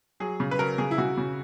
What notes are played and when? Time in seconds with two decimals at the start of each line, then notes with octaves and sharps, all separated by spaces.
0.20 F#3 G#4
0.40 C#3
0.51 B4
0.59 F#3 A#4
0.78 C#3 G#4
0.91 E4
0.98 C#3 F#4
1.18 C#3